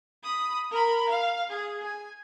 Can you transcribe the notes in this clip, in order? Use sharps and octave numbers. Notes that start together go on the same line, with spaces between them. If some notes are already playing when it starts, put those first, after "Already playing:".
B5 D#6
A#4 B5
F5
G#4
G#5